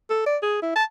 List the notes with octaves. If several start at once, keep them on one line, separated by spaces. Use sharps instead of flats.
A4
D5
G#4
E4
A5